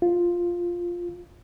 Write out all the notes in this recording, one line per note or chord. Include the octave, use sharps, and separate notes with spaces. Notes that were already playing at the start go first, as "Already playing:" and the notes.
F4